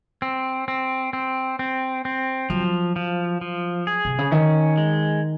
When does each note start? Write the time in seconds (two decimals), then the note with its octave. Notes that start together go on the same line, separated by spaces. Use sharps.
0.22 C4
0.68 C4
1.13 C4
1.59 C4
2.05 C4
2.50 F3 F#3
2.96 F3
3.41 F3
3.87 G#4
4.05 C3
4.19 C#3
4.31 D#3 C#4
4.77 G#3